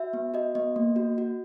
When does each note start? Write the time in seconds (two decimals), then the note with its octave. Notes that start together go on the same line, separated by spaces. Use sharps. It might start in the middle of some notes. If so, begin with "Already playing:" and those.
Already playing: F#4 E5
0.13 B3
0.34 F#4 D#5
0.55 B3 D#5
0.76 A#3
0.96 F#4
1.18 F#4